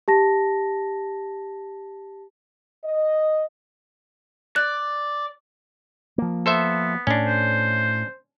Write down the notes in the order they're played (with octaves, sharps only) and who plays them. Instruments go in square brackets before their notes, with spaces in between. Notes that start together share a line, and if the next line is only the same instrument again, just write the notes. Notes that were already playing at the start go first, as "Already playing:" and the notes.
[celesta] G4 A5 A#6
[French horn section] D#5
[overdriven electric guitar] D5 [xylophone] F#6
[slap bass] F3 A#3
[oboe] B3 [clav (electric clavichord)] A4 C5 E5
[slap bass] A2 [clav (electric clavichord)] C#4 D4
[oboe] C5